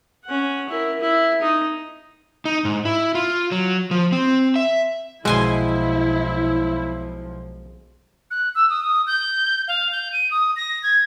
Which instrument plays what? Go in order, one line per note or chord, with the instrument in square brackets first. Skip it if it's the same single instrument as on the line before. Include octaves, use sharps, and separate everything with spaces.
[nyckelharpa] C#4 F#5
E4 A#4
E4
D#4
[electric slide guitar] D#4
G#2
E4
F4
F#3
F3
C4
E5
[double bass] B1 F3 [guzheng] B2 G#5 C6 [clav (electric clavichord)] G#3 [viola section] E4
[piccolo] F#6
E6
D#6
G6
F5
G6
D#7
D#6
A#6
G#6